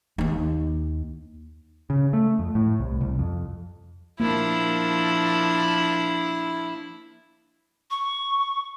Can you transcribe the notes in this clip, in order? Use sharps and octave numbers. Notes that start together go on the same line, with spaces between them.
D#2 D#4
C#3
A3
F2
A2
C2
C2
F2
F3 A#3 D4 E4
C#6